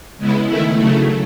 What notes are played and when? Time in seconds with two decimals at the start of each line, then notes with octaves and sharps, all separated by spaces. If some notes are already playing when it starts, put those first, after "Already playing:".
0.17 C#3 G#3 B3 E4
0.46 D#3 A3 E4
0.76 C#3 F#3 A3